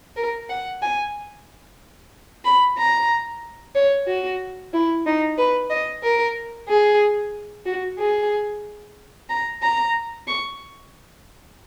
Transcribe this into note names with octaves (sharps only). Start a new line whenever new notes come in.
A#4
F#5
G#5
B5
A#5
C#5
F#4
E4
D#4
B4
D#5
A#4
G#4
F#4
G#4
A#5
A#5
C#6